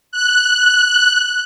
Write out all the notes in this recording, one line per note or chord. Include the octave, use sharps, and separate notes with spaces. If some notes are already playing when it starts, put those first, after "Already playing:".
F#6